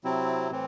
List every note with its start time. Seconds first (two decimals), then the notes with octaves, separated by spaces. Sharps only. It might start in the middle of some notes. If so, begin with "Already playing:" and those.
0.04 C3 F#3 C4 E4
0.51 A2 E3 C4